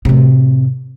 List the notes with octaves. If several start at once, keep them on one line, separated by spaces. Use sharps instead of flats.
A2 C3